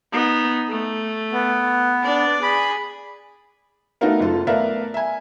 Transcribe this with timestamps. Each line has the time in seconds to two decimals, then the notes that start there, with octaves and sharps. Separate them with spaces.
0.12 B3 D#4
0.69 A3
1.32 B3
2.03 D4 D5
2.43 G#4 B5
4.01 A3 B3 D#4 F#4 A#4 F5
4.20 F#1 F4 A4
4.47 A3 B3 A#4 D5 E5 F5
4.94 E5 G#5